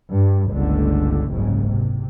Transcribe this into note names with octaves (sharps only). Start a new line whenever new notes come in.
G2
G1 C#2 D3 A3
F#1 C2 G#2 C#3
C3